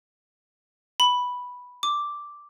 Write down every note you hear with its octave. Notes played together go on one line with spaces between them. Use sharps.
B5
D6